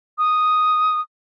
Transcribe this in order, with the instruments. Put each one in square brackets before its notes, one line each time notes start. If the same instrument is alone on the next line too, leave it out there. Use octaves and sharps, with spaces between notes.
[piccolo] D#6